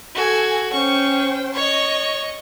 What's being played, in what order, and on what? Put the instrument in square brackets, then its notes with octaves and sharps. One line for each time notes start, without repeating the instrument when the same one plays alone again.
[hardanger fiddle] F#4 [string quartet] A4 G#5
[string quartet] C#4 C5 G5 [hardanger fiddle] C#6
[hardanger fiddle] C#5 [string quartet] D#5 C#6